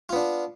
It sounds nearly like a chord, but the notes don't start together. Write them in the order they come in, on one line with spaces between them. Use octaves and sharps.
F4 B3 D4